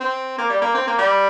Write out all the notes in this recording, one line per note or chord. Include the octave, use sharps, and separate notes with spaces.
C4
A#3
G3
A#3
C4
A#3
G3